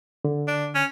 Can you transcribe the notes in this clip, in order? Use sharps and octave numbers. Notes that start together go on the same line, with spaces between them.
D3
D4
C#4